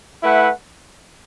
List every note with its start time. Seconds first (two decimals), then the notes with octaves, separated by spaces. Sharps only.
0.23 A3 E4 B4 F#5